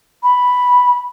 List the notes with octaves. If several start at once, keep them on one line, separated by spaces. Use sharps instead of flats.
B5